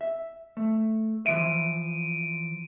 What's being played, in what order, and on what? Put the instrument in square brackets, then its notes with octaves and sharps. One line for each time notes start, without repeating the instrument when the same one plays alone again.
[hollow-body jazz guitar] E5
A3
[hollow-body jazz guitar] E3 F3 E5 [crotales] D7 D#7